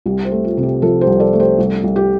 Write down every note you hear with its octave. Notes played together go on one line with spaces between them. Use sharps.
C2 G4
G4 C5
A3
F4
C3
G4
F3 F4 A4
G4 C5
C2
A4 D5
A3
G4 C5
C2
C2
G4